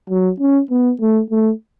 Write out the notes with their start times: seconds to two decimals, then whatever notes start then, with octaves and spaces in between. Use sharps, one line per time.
0.10 F#3
0.40 C#4
0.71 B3
1.01 A3
1.30 A3